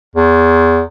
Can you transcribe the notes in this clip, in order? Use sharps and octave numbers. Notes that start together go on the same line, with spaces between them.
E2